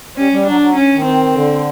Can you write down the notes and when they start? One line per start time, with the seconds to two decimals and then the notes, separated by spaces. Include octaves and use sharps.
0.17 G3 C#4
0.32 G3
0.46 F#3 D4
0.61 F#3
0.75 C#4
0.94 D#3
1.04 C4
1.33 D3